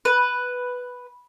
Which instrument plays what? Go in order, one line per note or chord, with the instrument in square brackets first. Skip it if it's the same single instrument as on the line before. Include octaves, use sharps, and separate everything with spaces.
[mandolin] B4